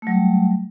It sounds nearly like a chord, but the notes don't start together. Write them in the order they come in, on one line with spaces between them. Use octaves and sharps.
A3 F#3 G3